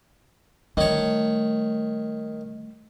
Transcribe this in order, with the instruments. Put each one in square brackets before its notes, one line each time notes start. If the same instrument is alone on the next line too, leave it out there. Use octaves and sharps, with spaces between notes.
[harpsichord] D#3 C#5 [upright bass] G3 A3